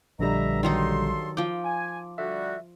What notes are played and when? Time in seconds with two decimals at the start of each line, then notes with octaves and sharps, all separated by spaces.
0.19 A#1 B2 D3 G3 E5 A#5
0.63 G2 D#3 F#3 D#4 A4 C6
1.37 F3 G5 D6
1.65 G#5
2.18 D3 G3 F#4 E5